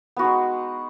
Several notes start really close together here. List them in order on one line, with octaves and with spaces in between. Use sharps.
B3 F#4 D#4 G#3